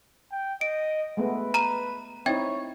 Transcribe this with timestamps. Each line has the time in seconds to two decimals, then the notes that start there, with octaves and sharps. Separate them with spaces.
0.32 G5
0.61 D#5 D7
1.17 G#3 A3 B3 B4
1.54 A#5 D#7 E7
2.26 C4 D#4 E4 C#5 E5 G5 G#6